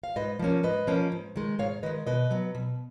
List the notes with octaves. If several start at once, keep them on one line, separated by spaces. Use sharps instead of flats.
F5
G#2 B4 D#5
F3 A#3 C#4
G#2 B4 D#5
F3 A#3 C#4
G#2
D#3 G#3
G#2 C#5 F5
D#3 G#3 B4 D#5
B2 B4 D#5
F#3 B3
B2